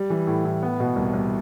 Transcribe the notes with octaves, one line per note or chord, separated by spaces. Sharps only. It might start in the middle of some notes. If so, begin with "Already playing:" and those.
Already playing: G3
E3
A2
A2
B3
B2
C2
C2